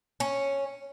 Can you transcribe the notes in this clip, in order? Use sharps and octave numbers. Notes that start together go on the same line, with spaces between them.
C#4